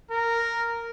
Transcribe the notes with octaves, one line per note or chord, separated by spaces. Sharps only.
A#4